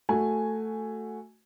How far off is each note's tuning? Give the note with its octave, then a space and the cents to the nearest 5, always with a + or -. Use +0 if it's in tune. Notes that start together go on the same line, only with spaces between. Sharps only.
A3 +5 F#4 +0 G#5 +0